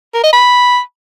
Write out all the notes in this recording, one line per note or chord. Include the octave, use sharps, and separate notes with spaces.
A#4
D#5
B5